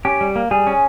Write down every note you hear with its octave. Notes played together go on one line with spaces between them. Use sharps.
C#4 G4
G3
A#3
G3 G#4
C#4